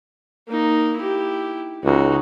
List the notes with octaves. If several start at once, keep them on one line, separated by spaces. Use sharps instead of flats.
A#3 D#4
E4 G4
C#2 D#4 F#4